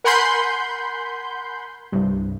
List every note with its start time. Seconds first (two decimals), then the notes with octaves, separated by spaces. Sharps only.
0.04 A#4 F#5 G#5 B5 C6 G6
1.92 C2 G2